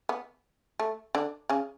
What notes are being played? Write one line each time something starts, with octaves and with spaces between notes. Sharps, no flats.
B3
A3
D3 D4
C#3 C#4